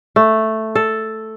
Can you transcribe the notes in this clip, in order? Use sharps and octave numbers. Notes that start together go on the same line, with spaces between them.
A3
A4